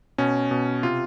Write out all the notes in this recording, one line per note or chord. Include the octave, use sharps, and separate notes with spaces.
B2 C#4
B2
C3 F4